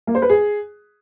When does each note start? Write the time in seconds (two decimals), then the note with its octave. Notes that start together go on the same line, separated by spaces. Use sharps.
0.07 A#3
0.15 C5
0.22 B4
0.29 G#4